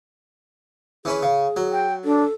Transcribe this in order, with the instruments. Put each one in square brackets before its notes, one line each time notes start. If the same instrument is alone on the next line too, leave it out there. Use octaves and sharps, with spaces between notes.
[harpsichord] E3 C#4 B4 [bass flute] G#4
[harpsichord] C#3
F#3
[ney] G5
[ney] D4 [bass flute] A4